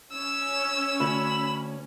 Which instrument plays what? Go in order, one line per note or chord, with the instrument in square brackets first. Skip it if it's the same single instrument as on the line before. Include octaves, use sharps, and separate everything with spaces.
[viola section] C#4 [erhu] E6
[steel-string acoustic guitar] D2 [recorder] B5